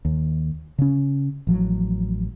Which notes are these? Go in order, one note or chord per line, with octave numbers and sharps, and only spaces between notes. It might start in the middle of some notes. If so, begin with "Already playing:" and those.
D#2
C#3 C#4
A1 F3 F#3